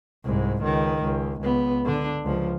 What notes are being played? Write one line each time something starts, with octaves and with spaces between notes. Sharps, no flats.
C2 G#2
C#2 D#3
C#2
C#2 B3
D3 D4
C#2 F3